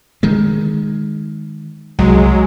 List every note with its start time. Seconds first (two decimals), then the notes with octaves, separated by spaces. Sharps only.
0.23 D#3 G#3
1.99 C2 F#3 G#3